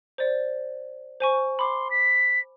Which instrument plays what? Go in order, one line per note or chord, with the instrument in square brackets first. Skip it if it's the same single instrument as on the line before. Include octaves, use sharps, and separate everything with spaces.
[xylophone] C5 D5
C5 G#5 C#6
[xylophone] B5 D6 [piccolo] C6
[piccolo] B6